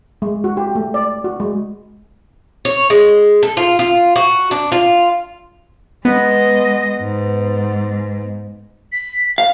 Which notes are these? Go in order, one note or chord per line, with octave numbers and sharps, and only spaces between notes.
G#3
F#4
G4
A3
D5
F#4
G#3
C#5
G#3
A4
F4
F4
F#4
D4
F4
G#3 B3 D#5
G#2
B6
F5